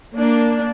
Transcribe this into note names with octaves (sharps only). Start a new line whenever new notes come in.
A#3 D4